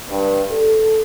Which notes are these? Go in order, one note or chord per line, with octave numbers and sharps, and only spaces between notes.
G2
A4